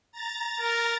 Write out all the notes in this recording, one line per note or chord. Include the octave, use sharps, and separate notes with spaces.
A#5 A6
A#4